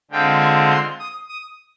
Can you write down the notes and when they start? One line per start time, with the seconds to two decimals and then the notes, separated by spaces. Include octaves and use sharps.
0.11 D3 G#3 C4 F4 G5
0.40 G#5
0.70 C6
0.99 D#6
1.29 D#6